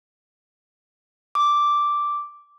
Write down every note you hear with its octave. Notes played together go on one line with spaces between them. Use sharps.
D6